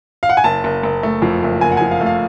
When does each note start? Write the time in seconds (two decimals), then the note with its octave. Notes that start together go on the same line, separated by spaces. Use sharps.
0.23 F5
0.29 F#5
0.37 G#5
0.44 F#1 A5
0.64 F#1
0.83 F#1
1.03 A3
1.22 F2
1.43 F#1
1.61 F#1 G#5
1.72 F#5
1.77 F3 G#5
1.91 F5
2.01 A3
2.06 F5